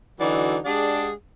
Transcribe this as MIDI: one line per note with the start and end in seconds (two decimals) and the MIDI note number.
0.20 0.57 50
0.20 0.57 52
0.20 0.57 54
0.20 0.57 63
0.20 0.57 66
0.20 0.57 74
0.65 1.10 56
0.65 1.10 62
0.65 1.10 67
0.65 1.10 68
0.65 1.10 74
0.65 1.10 78